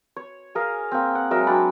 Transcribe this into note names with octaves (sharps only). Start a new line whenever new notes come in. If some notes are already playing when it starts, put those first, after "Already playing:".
C#5
G#4 A#4 F5
A#3 C4
F#5
F#3 G#3 A#4 E5
F#3 C4 D4 B5